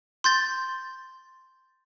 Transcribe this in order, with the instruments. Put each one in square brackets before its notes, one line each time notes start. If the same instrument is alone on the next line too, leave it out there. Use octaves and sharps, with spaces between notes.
[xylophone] C6 G6 A6